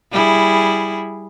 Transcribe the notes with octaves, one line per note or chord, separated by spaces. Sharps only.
G3 E4 G#4